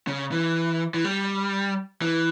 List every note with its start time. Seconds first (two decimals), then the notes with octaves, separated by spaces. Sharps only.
0.07 C#3
0.32 E3
0.94 E3
1.04 G3
2.02 E3